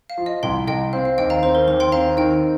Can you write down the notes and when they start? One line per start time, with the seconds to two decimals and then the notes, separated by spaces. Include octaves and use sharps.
0.10 F5
0.17 F3
0.26 D#5
0.43 C2 G5 C6
0.67 C2 D#5 G5
0.93 C4 F5
1.05 F5
1.18 D#2 D#5 G5
1.30 F5 A#5
1.42 C4 C5
1.55 A#4
1.67 D#2 C5
1.80 G5 C6
1.92 C4 F5 A#5
2.17 D#3 D#5 G5